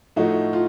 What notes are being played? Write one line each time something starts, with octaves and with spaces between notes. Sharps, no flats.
A2 F3 A3 D#4 F#4
F4